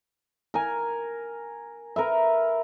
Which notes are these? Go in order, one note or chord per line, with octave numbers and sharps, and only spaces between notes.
A#4 G#5
A#4 B4 E5